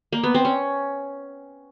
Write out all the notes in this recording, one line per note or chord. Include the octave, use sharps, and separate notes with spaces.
A#3
B3
C4
C#4